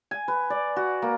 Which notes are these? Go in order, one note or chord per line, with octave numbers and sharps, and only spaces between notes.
G#5
B4
D5
F#4
A#3